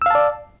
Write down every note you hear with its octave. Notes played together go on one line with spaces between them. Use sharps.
D5 F5 A5 E6